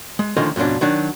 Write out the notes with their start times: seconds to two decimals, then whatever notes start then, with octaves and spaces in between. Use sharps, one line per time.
0.19 G#3
0.37 D3 D#3 F3 A3 C#4 D#5
0.56 F2 G#2 B2 C#4 D4
0.81 D#3 F#3 D4